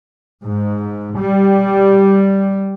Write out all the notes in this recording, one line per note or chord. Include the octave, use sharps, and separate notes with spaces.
G#2
G3